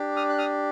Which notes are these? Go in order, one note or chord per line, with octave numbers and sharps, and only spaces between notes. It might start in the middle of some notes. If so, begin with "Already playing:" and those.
Already playing: D4 G4
D#6 F6
F#6
D#6 F6